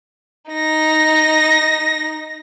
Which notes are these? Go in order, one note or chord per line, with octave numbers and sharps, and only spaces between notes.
D#4 A#6